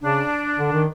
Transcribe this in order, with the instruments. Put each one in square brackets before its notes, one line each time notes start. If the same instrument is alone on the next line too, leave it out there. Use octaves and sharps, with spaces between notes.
[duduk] C#3 [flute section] D4
[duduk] D3
D#3